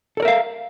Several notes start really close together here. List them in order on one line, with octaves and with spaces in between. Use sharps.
A4 D5 A#4 E5 F5